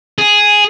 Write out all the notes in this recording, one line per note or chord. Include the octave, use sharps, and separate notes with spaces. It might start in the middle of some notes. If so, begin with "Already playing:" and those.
G#4